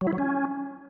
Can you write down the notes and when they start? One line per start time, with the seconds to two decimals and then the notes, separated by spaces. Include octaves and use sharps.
0.01 F#3
0.07 E4
0.13 F#3
0.18 C#4